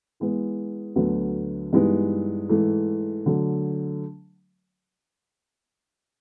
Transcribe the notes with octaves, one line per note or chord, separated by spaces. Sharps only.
E3 G#3 B3
D2 D3 F#3 B3
G2 E3 G#3 B3 D#4
G#2 E3 A3
D3 F#3 A3